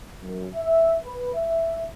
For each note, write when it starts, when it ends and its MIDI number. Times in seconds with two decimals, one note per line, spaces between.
0.21 0.47 42
0.54 0.95 76
1.04 1.33 71
1.34 1.86 76